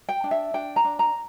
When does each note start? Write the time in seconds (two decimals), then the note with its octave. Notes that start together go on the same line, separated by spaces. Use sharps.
0.09 G5
0.24 D4
0.31 E5
0.54 D4 G5
0.76 A#5
0.85 D4
0.99 A#5